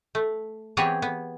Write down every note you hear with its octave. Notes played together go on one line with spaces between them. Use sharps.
A3
E3 B3 C4 G4 G#4 C#5
B3